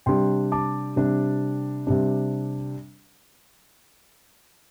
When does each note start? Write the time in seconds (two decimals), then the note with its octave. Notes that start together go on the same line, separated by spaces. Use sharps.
0.06 C3 G3 D4 G5 C6
0.52 A5 D6
0.96 C3 G3 D4
1.87 C3 G3 D4